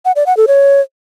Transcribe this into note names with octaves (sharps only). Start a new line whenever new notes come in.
F#5
D5
F#5
A4
C#5